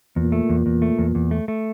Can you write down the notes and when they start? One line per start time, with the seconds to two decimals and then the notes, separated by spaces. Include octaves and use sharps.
0.16 E2 A#2
0.32 A3
0.49 E2
0.66 E2
0.82 A3
0.98 E2
1.15 E2
1.31 A3
1.48 A3